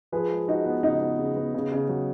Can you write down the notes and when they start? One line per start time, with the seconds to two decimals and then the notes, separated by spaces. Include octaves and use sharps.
0.12 F3 G#4 B4
0.31 G#3
0.48 G#3 D#4 F#4
0.66 B3
0.83 C#3 D#4
1.01 B3
1.19 C#3
1.36 B3
1.54 C#3
1.72 C#3
1.89 F#3